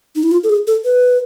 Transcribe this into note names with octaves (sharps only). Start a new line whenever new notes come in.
D#4
E4
F4
A4
G#4
A4
B4